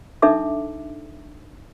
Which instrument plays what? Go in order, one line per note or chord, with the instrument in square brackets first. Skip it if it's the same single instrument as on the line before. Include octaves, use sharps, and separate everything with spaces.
[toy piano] D4 D#4 A4 E5 D6